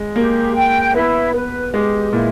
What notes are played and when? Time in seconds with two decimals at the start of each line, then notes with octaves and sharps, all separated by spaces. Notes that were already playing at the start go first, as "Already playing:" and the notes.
Already playing: G#3
0.16 A#3 G4
0.55 G5
0.95 B3 E4
1.34 B3 B4
1.73 G#3 G4
2.13 A#2 E4